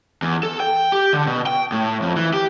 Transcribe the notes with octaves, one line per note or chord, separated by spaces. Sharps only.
E2
A4
G5
G4
D3
B2
G5
A2
F2
E3
G4